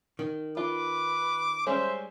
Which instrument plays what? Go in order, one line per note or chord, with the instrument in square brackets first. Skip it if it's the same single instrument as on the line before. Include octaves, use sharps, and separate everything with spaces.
[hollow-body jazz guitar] D#3
[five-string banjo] F4 [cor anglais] B4 [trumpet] D6
[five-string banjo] G3 G#3 C#4 [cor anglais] C5 [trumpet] E5